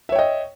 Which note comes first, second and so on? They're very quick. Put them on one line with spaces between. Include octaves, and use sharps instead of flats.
E5 C#5 G5 D#5